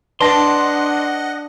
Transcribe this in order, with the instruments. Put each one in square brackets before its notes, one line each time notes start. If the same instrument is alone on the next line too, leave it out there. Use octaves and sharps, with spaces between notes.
[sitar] D4 [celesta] B4 A5 A#6 [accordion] D#5 F#5 [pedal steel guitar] C6